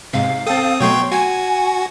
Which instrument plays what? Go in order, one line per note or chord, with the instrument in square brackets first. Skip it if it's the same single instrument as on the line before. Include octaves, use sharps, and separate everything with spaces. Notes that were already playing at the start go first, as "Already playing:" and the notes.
[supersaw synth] G#2 C3 [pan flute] F5
[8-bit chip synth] C4 D#6 [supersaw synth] A4 G5 A6
[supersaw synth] B2 F#3 A3 [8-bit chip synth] C#5 G5 C6 [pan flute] C#6
[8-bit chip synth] F#4 [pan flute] G#5 [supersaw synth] G#6